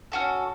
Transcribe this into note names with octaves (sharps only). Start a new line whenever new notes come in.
C#4 F#4 A4